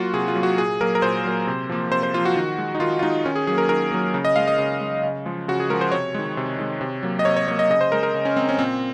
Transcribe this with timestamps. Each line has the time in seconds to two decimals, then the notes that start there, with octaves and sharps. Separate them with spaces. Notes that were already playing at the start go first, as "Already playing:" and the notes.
Already playing: F#3 A#3 F4 F#4
0.14 C3 G#4
0.28 F4
0.35 F#3 A#3
0.43 F#4
0.58 A#2 G#4
0.81 F#3 A#3 A#4
0.95 A#4
1.02 A#2 C5
1.25 F#3 A#3
1.47 C3
1.69 F3 A#3
1.91 C3 C5
2.03 C5
2.14 F3 A#3 F4
2.25 F#4
2.36 D#3
2.58 G#3
2.75 D#4
2.80 D#3 F4
2.99 F4
3.03 G#3 D#4
3.25 D#3 C#4
3.36 G#4
3.47 F#3 A#3 G#4
3.58 A#4
3.69 D#3 A#4
3.91 F#3 A#3
4.14 C#3
4.25 D#5
4.36 G#3 F5
4.47 D#5
4.58 C#3
4.81 G#3
5.03 C#3
5.26 F3 G#3
5.48 C#3 F#4
5.60 G#4
5.70 F3 G#3 A#4
5.81 C5
5.92 C3 C#5
6.15 D#3 G#3
6.37 C3
6.59 D#3 G#3
6.81 C3
7.03 F#3 A#3
7.19 D#5
7.25 C3 C#5
7.36 C#5
7.48 F#3 A#3 C#5
7.59 D#5
7.70 C#3 D#5
7.81 C5
7.92 G#3 A#4
8.03 A#4
8.14 C#3
8.25 C#4
8.36 G#3 C4
8.49 C#4
8.59 A#2 C4